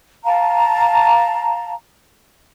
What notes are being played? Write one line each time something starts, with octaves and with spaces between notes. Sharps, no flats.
F5 A5 A#5